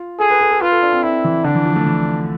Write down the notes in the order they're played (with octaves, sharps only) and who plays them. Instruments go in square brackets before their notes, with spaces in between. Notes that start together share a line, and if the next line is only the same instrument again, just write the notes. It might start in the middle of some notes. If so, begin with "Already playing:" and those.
Already playing: [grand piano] F4
[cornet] G#4 [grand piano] A4
[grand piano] B4
A4
A4
[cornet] F4 [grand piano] B4
[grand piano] A4
D4
C4
[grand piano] C4 [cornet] E4
[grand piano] E3
[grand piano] D3 [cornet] D4
[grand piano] E3
F3
A3
E3